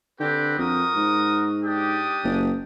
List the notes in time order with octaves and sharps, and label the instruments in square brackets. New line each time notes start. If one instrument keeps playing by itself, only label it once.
[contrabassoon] D3 [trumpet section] C4 G4 B4
[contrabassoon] F2 [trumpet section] F#4 A#4 D#6
[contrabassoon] G#2
[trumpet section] D4 G4 D#6
[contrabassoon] F#1